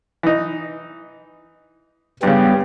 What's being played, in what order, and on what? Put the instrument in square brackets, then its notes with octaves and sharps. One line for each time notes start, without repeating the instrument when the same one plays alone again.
[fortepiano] E3 D#4
[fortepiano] G2 C#3 [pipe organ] G3 B3 G4